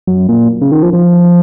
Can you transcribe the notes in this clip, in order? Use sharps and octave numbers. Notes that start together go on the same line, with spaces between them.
F#2
A#2
C#3
D#3
F3
F3